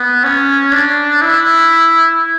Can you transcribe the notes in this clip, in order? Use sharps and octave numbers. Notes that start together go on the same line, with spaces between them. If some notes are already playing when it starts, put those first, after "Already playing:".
Already playing: B3
C#4
D4
E4